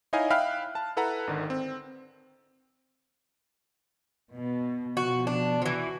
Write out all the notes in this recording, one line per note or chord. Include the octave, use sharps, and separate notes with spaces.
D#4 E4 C#5 D#5 F5 G#5
E5 F5 G5 B5 F6 F#6
A5
E4 A4 B4 F#5 A#5
G#1 D3 D#3
C4
B2
B2 F3 F#4
D4
E3 F3 F#4